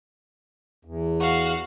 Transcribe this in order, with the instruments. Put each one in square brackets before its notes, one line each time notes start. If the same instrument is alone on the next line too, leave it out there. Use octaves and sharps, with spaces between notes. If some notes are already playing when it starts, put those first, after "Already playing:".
[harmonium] E2
[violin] F#4 F5